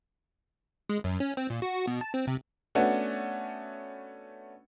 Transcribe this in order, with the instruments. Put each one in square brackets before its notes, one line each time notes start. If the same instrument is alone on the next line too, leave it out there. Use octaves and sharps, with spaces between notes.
[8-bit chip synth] G#3
F#2
C#4
C4
A#2
F#4
F#4
B2
A5
C4
C3
[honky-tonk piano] A3 B3 C#4 D4 F#4